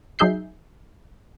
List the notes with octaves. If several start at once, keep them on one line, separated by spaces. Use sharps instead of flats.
F#3 D#4 G#4 E5 G6 C7